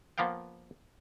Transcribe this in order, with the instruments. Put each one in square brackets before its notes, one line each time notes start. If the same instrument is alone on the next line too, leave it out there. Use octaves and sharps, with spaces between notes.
[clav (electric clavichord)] F3 A#3 B3 F5 G5